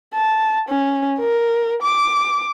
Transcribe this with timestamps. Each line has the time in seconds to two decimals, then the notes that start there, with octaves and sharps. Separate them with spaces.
0.14 A5
0.69 C#4
1.19 A#4
1.82 D6